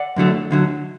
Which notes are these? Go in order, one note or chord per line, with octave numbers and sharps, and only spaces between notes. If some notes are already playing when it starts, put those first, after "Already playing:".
Already playing: D5 F#5
F#2 D3 F#3 A3
D2 D3 F#3